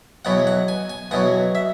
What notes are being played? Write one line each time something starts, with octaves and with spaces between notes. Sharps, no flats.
E2 B2 F#3 F#5
F#5
G#5
G#5
E2 B2 F#3 F#5
E5